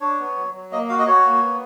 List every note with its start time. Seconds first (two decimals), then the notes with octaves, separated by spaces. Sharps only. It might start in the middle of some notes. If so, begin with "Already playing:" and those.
0.01 D4 C#5
0.19 B3
0.37 F#3
0.54 F#3
0.72 A#3 D#5
0.89 F#4 F5
0.99 D#5
1.07 F#4 C#5
1.25 A#3
1.42 B3